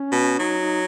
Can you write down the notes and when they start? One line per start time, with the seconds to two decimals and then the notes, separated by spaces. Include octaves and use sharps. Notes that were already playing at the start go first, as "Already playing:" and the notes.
Already playing: C#4
0.12 B2
0.39 F#3 D#4
0.59 D#4